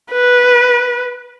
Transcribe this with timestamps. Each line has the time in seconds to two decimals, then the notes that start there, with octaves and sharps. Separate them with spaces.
0.12 B4